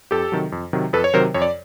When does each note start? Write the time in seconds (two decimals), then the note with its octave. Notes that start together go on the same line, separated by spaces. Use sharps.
0.11 F2 G4 A4
0.32 C3 D#3 F#3
0.52 F2
0.73 C3 D#3 F#3
0.93 F2 A4 B4
1.04 C#5
1.14 C3 D#3 F#3 A#4 C5
1.34 F2 C#5
1.42 D5